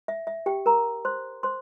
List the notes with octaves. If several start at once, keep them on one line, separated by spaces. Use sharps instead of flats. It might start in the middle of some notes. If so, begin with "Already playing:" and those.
E5
E5
G4 G5
A#4 A#5
C5 C6
C5 C6